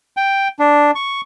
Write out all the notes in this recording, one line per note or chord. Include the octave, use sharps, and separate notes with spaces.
G5
D4
C#6